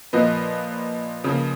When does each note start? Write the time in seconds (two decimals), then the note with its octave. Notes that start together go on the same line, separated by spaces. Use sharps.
0.13 A#2 F3 A#3 B4 D#5
1.24 C#3 F3 A#3